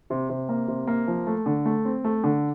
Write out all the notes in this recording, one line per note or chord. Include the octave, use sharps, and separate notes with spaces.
C3
C3
A#3
C3
A#3
F3
A3
D3
A3
C4
A3
D3